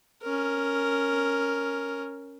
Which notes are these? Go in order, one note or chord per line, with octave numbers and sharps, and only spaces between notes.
C#4 A#4